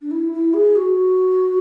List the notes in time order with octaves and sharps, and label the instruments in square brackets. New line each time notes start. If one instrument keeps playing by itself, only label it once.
[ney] D4
E4
E4
G#4
F#4